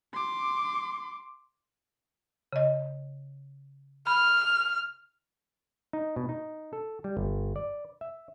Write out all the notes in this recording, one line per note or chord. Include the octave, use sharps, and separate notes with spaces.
C6 D6
C#3 D#5
B5 F6
D#4
B2
D#4
A4
G3
G1
D5
E5